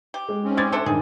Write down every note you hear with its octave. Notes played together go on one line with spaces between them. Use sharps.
G4
G#3
G#2 C4 C#4
G3 G#3 D6 G#6 A6
D4 A4 C5 E5
G2 D#3 G#4